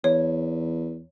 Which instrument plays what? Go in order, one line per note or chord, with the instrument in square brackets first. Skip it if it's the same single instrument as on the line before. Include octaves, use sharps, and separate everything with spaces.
[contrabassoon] E2 [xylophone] C#5